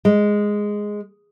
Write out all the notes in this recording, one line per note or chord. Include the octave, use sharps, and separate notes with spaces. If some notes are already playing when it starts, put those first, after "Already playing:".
G#3